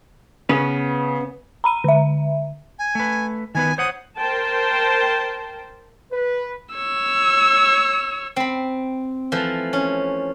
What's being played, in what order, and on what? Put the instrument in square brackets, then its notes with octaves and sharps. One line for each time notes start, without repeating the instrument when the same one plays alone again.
[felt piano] C#3 [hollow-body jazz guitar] B3 C#4 B4
[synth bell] A#5 B5 D#7
D3 E5
[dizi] G#5
[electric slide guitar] A3 B4
[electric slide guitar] D#3 B3 B4 [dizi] G#5
[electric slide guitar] C5 C#5 F#5 [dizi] D#6
[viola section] A#4 C5 G5 A5
[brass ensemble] B4
[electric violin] C#5 E6
[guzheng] C4 B5
E3 F3 A3
C#4